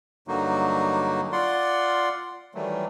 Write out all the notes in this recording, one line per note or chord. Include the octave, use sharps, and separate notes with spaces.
G2 D3 F#3 A#3 D#4 F#4
F4 D5 F#5 C6
D#3 E3 F#3 G3 A3